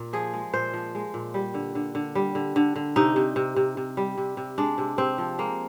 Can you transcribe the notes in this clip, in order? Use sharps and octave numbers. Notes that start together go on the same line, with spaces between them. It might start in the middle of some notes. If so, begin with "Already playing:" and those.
Already playing: A#2
F3 G#4
G#3
A#2 C5
F3
G#3
A#2
G3
D3
D3
D3
G3
D3
D3
D3
C3 D#4
C3
C3
C3
C3
G3
C3
C3
G#3 D4
C3
C3 C4
F3
G#3 A#3